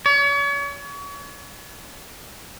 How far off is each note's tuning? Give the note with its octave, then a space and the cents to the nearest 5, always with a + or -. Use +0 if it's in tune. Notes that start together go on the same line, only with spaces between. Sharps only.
C#5 +40